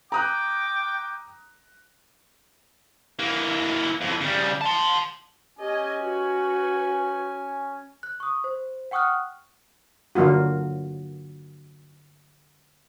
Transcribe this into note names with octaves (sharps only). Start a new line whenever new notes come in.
G5 A#5 D6 D#6 F#6
E3 A#3
F2 E3
C#3 G3
A5 C6
C#4 G4 D#5 G#5
F#4 B4
F#6
C#6 D#6
C5
F#5 G5 C#6 D#6 F6 F#6
D3 F#3 A#3 F4 F#4